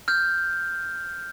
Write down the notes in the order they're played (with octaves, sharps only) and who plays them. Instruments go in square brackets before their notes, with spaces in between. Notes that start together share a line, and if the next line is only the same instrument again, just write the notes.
[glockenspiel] F6 G6